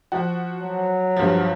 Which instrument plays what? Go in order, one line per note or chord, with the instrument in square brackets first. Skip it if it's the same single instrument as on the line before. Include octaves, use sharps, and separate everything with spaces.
[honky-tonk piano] F3 F#4
[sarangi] F#3
[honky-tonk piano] G2 F3